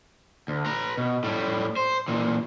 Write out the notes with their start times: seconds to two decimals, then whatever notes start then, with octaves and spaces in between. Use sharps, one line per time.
0.48 D2
0.66 B4 A#5
0.97 B2
1.24 A2 G3
1.76 C5
2.08 A#2 E3